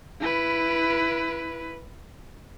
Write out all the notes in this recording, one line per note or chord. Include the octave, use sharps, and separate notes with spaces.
E4 B4